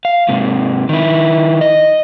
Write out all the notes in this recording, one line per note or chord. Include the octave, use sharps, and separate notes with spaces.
F5
G#2 C3
D#3 E4
D#5